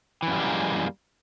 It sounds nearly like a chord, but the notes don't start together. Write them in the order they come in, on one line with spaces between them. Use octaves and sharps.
E3 F#2 G3 G#3 A#3